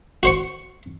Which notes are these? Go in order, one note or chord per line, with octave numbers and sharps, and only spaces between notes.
F#4 C5 C#6